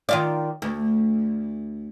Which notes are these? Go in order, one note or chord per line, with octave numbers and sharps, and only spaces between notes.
D#3 F4 D5
D2